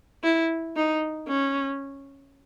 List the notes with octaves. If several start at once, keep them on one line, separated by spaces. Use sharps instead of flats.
E4
D#4
C#4